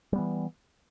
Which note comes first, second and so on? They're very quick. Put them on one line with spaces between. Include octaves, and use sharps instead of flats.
G3 B3 E3